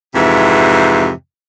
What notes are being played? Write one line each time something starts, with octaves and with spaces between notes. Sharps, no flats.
F2 G#2 C3 E3